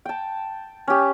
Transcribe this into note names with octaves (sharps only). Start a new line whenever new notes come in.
G5 A5
C#4 G4